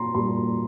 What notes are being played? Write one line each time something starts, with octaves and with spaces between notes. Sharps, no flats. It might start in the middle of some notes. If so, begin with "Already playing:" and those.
Already playing: A#2 A#5 C6
A#2 G3 C6